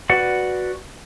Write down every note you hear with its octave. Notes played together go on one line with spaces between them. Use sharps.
F#4 B4 D5 F#5